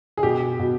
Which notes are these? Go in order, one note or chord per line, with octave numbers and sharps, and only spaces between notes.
G#4
B2 G4
B2